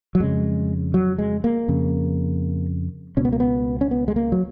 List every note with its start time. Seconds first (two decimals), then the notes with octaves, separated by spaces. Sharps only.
0.15 F#3
0.20 F2 C#3 G#3
0.94 F#3
1.19 G#3
1.44 A#3
1.68 F2 C#3
3.17 C#2 B2 C#4
3.25 B3
3.33 A#3
3.40 B3
3.81 C#4
3.91 B3
4.08 G#3
4.16 A#3
4.32 F#3